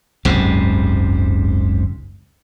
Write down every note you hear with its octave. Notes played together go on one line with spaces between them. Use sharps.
F#1 C#2 G#2 C3